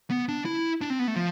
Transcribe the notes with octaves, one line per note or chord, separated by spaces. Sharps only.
B3
D4
E4
D4
C4
B3
A3
F3